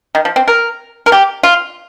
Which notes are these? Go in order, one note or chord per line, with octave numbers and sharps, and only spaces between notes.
D#3
F3
C4
A#4
A#4
G4
F4